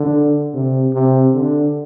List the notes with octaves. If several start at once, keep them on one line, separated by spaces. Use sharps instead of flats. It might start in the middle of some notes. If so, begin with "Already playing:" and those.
Already playing: D3
C3
C3
D3